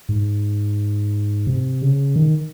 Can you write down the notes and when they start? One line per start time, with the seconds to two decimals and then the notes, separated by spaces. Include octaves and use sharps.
0.09 G#2
1.47 C3
1.81 C#3
2.16 D#3